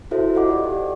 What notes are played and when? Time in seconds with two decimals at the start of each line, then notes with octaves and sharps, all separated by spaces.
0.11 E4 F#4 A4 C5 E5
0.34 F4 A4 C5 D#5 F#5 D6
0.48 G4 D5 D#5
0.64 G4